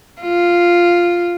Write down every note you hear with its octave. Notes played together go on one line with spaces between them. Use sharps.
F4